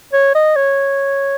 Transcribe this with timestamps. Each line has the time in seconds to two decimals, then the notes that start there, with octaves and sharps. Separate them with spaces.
0.13 C#5
0.35 D#5
0.56 C#5